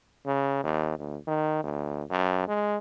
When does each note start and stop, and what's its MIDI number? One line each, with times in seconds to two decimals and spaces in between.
0.26 0.62 49
0.63 0.95 39
0.99 1.17 38
1.27 1.63 51
1.64 2.03 38
2.10 2.46 42
2.48 2.78 56